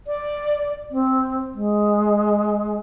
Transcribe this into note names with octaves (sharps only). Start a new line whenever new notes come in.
D5
C4
G#3